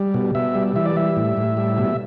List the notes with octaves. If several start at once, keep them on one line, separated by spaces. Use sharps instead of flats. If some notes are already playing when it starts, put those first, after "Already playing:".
Already playing: G3
B2
B2 E5
G3
E3 E5
D5
G3 E5
A2
A2
G3
B2